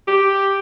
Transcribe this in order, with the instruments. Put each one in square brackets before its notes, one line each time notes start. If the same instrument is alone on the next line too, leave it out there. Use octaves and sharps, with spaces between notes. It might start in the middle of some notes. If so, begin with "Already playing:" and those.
[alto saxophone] G4